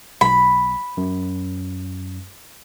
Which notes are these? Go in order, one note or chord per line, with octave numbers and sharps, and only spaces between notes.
B1 B5
F#2